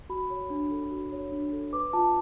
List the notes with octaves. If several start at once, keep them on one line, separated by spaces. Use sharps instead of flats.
F#4 B5
C#5
D4
A4
F#4
C#5
D4
A4
B4 D6
F4 A5